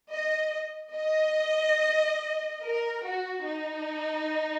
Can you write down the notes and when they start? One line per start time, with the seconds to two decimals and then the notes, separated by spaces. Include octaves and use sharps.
0.11 D#5
0.95 D#5
2.63 A#4
3.05 F#4
3.47 D#4